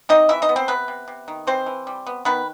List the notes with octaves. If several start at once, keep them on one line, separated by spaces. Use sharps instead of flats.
C3 D#4 D#5
E3 E4 E5
D#4 D#5
B3
C4 C5
C3 B3 B4
C3
C3
D#3
E3 C4 C5
E3
G3
B3
D#3 B3 B4